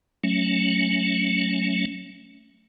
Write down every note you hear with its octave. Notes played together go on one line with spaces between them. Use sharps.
F#3 A3 C#4